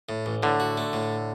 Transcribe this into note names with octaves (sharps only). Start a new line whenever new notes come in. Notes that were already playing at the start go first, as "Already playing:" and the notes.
A2
A1
A2 D3
F#4
A3
A2